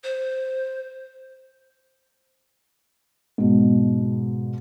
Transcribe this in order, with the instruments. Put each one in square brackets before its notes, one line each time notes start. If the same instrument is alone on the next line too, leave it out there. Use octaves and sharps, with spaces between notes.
[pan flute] C5
[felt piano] G#2 B2